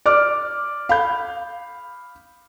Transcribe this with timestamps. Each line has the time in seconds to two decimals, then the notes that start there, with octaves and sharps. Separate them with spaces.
0.06 D5 D6 F6
0.89 F5 B5 G6